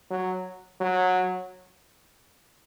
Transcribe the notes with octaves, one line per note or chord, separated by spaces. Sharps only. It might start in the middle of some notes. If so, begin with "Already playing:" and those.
F#3
F#3